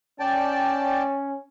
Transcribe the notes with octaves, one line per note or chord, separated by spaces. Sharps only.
C#4 D5 G5 A5